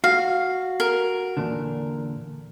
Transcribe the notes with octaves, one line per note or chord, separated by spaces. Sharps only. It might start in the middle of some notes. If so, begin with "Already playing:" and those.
F#4 F5
A#4
E2 A#2 D3